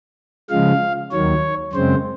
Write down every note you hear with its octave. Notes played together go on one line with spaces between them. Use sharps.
C#3 F3 G#3 F5
D#2 D#3 F#3 C#5
F#2 C#3 G#3 C4 C5